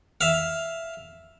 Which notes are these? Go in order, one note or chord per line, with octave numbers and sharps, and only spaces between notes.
E5 F5